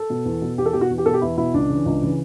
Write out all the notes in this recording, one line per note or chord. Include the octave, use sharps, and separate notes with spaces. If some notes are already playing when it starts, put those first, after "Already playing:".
Already playing: A4
B2
E2
B2
E2 G4
A4
B2 G4
F#4
E2
G4
B2 A4
G4
E2 E4
B2 E4
C#2 D4
C#3 E3
C#2
C#3 E3